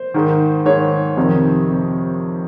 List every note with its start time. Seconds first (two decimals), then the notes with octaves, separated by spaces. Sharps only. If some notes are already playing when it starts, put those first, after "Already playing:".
Already playing: C5
0.14 G#2 D#3
0.66 G#2 D#3 C#5
1.17 F2 C3 D#3
1.70 C3